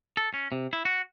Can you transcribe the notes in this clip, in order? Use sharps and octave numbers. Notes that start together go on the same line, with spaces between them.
A4
C#4
C3
E4
F#4